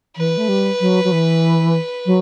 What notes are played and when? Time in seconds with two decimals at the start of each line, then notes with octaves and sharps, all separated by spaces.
0.17 E3 B4
0.37 A3
0.49 G3
0.80 F#3
1.04 F#3
1.12 E3
2.06 F#3